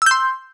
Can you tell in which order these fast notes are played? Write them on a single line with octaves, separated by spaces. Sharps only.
E6 G6 C6